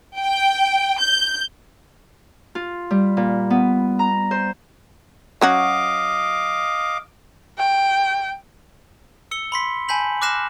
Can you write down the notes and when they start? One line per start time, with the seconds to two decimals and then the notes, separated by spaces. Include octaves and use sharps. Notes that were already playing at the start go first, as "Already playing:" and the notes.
0.19 G5
1.00 G6
2.55 F4
2.91 G3
3.17 A#2
3.50 B3
3.99 A#5
4.31 C5
5.41 F#3 C#4 F#4 D#5 F5 D6
7.58 G5
9.31 E6 C#7 G7
9.52 B5 C6 B6
9.89 G#5 A5 B5 G6 B6 F#7
10.22 D6 F6 F#6 A#6 C7 E7